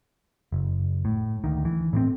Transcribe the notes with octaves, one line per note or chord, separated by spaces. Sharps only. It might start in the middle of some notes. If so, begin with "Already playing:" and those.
F#1
A2
D2 D#3
E3
A2 A#3 C4